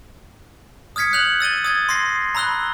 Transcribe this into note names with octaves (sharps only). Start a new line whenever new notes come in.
D#6 F6 G#6 B6 C#7
F#6 G6 F7 F#7
E6 A6 D#7 G7
D#6 G#6 A6
C6 D#6 A#6 C7
A#5 B5 E6 F#6 G7